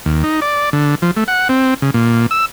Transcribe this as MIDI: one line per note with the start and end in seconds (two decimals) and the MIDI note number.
0.06 0.23 39
0.24 0.40 63
0.42 0.70 74
0.73 0.95 50
1.02 1.11 53
1.17 1.24 57
1.28 1.48 78
1.49 1.74 60
1.82 1.91 49
1.94 2.26 46
2.31 2.45 88